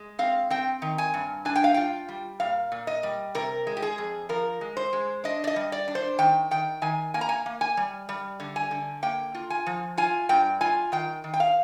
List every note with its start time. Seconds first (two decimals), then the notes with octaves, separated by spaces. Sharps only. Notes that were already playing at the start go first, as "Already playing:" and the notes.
Already playing: G#3
0.19 C4 F5
0.50 C4 G5
0.82 D#3
0.98 G#5
1.14 G2
1.45 D4 G#5
1.56 G5
1.64 F5
1.74 F4 G5
2.08 G3
2.40 A#2 F5
2.72 A#2
2.87 D#5
3.03 G3
3.35 C3 A#4
3.67 G#3
3.77 G4
3.82 G#4
3.98 F2
4.29 F3 A#4
4.61 G#3
4.77 C5
4.93 G#3
5.24 D4 D#5
5.44 D5
5.47 D#5
5.56 G3
5.72 D5
5.88 D4
5.95 C5
6.18 D#3 G5
6.51 D#3 G5
6.82 D#3 G#5
7.14 A#3 G#5
7.21 A#5
7.29 G#5
7.46 A#3
7.61 G#5
7.77 G3
8.09 G3
8.40 D3
8.56 G#5
8.71 D3
9.03 A#3 G5
9.35 F4
9.50 G#5
9.66 F3
9.97 F4 G#5
10.29 G2 G5
10.61 F4 G#5
10.92 D#3 G5
11.24 D#3
11.34 G5
11.40 F5